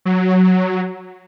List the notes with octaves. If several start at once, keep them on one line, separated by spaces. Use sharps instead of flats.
F#3